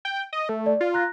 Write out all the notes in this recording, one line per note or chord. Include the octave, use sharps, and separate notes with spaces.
G5
D#5
A3
D5
F4
A#5 F#6 A#6